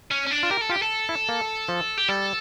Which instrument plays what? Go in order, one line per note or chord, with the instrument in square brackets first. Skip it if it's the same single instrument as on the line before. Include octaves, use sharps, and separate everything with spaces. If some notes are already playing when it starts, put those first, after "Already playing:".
[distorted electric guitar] C#4
C#4
D4
[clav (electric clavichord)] F4
[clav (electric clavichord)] G4 [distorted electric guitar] A#4
[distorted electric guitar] A4
[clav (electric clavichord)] F4 [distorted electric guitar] G4
[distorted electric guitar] A4
[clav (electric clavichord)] E4
A#3
F3
[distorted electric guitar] G4
[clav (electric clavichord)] G3 [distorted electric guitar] A4